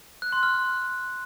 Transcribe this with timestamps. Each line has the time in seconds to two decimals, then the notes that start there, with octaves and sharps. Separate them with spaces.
0.22 F#6
0.32 C6
0.43 F6